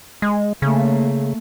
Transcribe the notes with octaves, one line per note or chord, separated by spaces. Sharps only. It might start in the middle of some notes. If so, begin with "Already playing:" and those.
G#3
C#3 A3 A#3